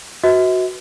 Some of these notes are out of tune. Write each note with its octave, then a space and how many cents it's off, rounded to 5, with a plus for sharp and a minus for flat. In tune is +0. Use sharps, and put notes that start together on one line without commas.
F#4 +0 B4 +0 E5 -45